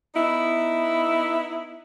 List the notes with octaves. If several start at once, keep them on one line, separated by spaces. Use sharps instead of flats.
B3 D#4 E4